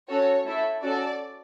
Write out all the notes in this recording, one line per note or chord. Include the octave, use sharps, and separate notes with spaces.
C#4 F#4 A4 C#5
A3 E4 A4
C#4 F#4 A4 D5